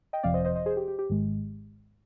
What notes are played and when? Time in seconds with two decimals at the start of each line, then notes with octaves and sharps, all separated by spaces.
0.13 D#5 G5
0.23 G1 F2 C3 F3 C4 D5 F5
0.34 C5 D#5
0.45 C5 D#5
0.55 C5 D#5
0.66 G#4 C5
0.77 G4
0.88 G4
0.99 G4
1.09 G#1 G#2 D#3 G#3